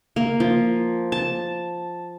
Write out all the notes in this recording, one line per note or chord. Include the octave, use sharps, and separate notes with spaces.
A#3
F3
A5